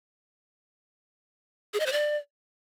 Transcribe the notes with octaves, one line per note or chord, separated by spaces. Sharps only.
G#4
D#5
C5
D5